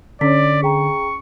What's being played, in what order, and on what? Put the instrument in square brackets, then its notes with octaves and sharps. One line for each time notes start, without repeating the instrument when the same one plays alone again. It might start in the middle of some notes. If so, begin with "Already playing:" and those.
[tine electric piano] D3 [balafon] C#4 C#5 [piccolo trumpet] D5 [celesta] B6
[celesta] G#4 G5 A#5 [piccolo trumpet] C#6